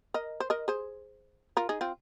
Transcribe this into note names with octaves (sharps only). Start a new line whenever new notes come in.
A#4 D#5
C5
A#4 D#5
G#4 C5
F4 A#4
D#4 G#4
C4 F4